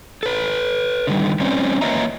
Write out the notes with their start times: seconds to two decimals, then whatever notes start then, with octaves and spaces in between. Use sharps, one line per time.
0.23 A4 B4
1.07 D3 D#3 G3
1.40 G3 C4 C#4 C5 D5
1.81 A#3 B4 C#5 D#5 E5 A#5